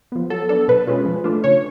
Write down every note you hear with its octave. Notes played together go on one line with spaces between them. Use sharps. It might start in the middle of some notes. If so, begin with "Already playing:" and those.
F3 B3
F#3 A4
B3 D4 A4
B2 B4
G#3 C#4 F4
F3
A3 D4 F4
C#3 C#5